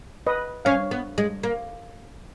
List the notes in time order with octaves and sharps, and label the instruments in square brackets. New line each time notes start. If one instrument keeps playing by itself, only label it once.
[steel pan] B4 D#5
[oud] C#4 [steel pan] C#5 F5
[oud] B3
G#3
A#3